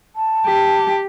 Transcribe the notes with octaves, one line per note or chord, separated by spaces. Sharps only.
A5
G4